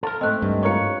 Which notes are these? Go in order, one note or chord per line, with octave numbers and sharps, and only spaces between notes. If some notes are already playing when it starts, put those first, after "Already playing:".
A4 A#4
G#2 A3 C4 D#5 F#6
G2
F4 A#4 C#5 C#6 C#7